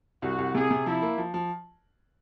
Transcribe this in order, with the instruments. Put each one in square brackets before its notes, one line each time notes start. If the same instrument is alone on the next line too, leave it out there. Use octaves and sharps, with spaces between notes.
[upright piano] C2 [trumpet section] F#4
[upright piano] C2
[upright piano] C3 [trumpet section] G#4
[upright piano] C3
[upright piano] F3 [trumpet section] E4
[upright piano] A#3
F3
F3